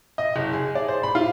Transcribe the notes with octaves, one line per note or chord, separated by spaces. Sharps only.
D#5
F#1
G#4
D5
C5
B5
F4